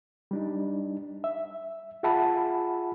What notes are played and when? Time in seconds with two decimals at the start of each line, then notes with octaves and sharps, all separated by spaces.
0.31 G3 D4 D#4
1.24 E5
2.03 F4 G#4 E5 F#5 A5 B5